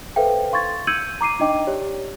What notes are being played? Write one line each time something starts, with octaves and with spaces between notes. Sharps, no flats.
A4 B4 C5 E5 F5 G5
F5 C6 C#6 G#6 A6
E6 G6 G#6 C#7 D#7 F#7
A#5 D6 C7 D#7
D4 D#4 D#5 G5 D6
G4 C#5 D5